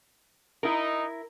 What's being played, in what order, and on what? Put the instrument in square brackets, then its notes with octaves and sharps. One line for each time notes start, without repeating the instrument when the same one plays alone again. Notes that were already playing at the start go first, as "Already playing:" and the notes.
[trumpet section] D#4 [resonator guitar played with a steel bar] E4 A#4